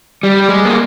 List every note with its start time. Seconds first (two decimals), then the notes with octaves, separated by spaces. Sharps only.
0.23 G3
0.49 G#3
0.65 A#3